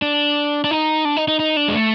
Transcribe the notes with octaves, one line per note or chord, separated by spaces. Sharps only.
D4
D4
D#4
D4
D#4
D#4
D#4
D4
G#3
A3